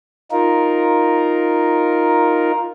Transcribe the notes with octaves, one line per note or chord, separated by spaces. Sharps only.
D#4 F4 A#4